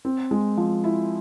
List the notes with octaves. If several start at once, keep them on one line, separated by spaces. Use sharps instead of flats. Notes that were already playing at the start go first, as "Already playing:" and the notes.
C4
G#3
F3
E4